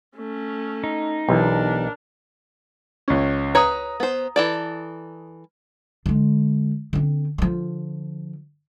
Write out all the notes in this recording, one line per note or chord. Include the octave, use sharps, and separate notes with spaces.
A3 C#4
D#4
B1 E3 D4 G4 A#4
C#2 C#4
B4 C#5 A#5 D#6
B3 C5
E3 A4 D5
D3 G#3
D3 C4
D3 F3